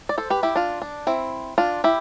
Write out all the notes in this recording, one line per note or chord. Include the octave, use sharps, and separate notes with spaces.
D5
A4 C5
G4 B4
E4 G4
D4 F4
D4
C4 E4
D4 F4
E4 G4